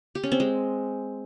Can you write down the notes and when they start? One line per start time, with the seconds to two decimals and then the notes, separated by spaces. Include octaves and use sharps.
0.15 G4
0.23 C#4
0.32 C4
0.40 G#3